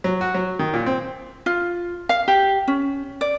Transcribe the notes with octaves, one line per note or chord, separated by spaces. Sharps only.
F#3
F#4
F#3
D#3
A#2
C4
F4
F5
G4
C#4
D5